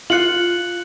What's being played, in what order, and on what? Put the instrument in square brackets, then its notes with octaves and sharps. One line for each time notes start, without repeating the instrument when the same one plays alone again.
[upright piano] F4 [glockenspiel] F#6 C#7 F#7